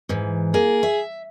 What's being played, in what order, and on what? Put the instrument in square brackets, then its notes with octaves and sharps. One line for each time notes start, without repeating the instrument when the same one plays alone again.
[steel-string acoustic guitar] G#2 E3
[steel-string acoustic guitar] A#3 [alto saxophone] G#4
[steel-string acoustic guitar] E5